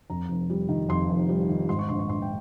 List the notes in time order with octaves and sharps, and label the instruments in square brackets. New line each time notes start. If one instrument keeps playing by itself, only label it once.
[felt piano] F2 A#5
F1
G3
D#3
F2 C6
F1
G3
D#3
G#2 C6
C#6
A#1 C6
C#6
A#1 C6
G5